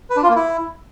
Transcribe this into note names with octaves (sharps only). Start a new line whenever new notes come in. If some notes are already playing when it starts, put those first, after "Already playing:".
B4
D4
F4
A#3
E4